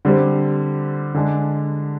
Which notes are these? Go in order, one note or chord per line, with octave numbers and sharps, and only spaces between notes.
D3 G3 C4 G4
D3 G#3 D4